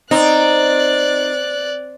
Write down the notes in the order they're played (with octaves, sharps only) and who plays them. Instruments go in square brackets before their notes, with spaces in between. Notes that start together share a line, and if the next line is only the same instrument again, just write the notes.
[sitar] C4 [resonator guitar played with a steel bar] D#4 [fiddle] D5 F#6